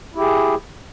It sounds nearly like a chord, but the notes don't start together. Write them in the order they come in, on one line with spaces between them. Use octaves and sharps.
E4 G4 G#4